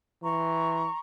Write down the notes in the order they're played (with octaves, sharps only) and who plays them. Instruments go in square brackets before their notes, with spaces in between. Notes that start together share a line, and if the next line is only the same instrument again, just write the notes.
[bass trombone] E3 [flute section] A#5 C6 C#6